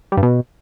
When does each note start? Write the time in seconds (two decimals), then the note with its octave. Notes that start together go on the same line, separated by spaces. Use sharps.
0.12 G3
0.17 G2
0.23 B2